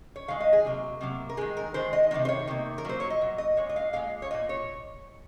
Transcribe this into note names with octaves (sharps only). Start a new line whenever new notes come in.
C#5
D#3 G#3 F5
D#5
G#4
C3 F#3 A#3
C3 F#3 A#3
A#4
D#3 G#3 G#4
A#4
D#3 G#3 C5
D#5
C3 D#3 F#3 A#3 D#5
C5
C#5
C3 D#3 A#3
A#4
A#2 F#3 A#3 C5
C#5
D#5
A#2 F#3
D#5
A#2 G#3 C#5
D#5
F5
A#2 G#3 F5
C#5
A#2 F#3 A#3 D#5
C#5